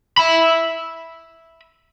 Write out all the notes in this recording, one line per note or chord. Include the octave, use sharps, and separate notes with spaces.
E5 B5